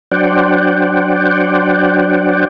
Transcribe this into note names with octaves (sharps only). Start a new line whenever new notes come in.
F#3 D4 C5 D5 F#5 G5